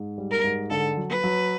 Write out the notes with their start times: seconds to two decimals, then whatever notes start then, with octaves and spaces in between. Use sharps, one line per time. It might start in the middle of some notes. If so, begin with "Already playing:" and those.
Already playing: G#2
0.18 G3
0.31 A#4
0.44 G#2
0.70 D3 A4
0.97 F#3
1.10 B4
1.24 F#3